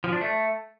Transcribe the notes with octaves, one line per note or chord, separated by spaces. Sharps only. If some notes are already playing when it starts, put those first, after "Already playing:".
F3
D4
A3